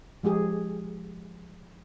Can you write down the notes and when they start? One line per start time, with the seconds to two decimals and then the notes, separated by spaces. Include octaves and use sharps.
0.23 F3 G#3 G4 G#4